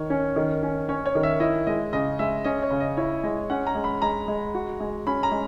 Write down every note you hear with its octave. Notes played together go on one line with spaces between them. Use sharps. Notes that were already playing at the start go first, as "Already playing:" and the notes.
Already playing: D#3 C#5
C#4
D#3
C#4
C#4 C#5
C#5
D#3
E5
E4 D#5
G#3 D#5
C#3 D#5
G#3 E5
C#4 D#5
C#5
C#3
D#5
E4 C#5
G#3 D#5
C#4 F#5
A#5
G#3
B5
G#3 A#5
G#3
F#4
G#3
C#4 B5
A#5
G#3